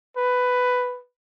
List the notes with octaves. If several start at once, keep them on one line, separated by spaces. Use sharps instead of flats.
B4